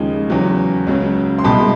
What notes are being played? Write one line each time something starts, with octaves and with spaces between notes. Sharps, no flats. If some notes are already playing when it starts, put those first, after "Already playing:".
Already playing: D#2 C#3 F3 G#3
E2 C#3 F#3
C#2 C#3 F#3
C6
C2 B2 G#3 A5 B5